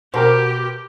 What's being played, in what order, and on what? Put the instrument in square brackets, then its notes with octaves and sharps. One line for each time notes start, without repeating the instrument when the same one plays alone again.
[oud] B2 [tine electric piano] F#4 G5 D6 [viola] G4 [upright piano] A#4 C5